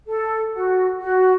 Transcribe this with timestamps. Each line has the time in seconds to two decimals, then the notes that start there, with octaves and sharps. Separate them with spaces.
0.07 A4
0.53 F#4
1.00 F#4